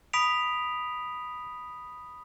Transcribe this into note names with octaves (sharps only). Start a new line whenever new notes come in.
B5 D#6 B6 D7 F7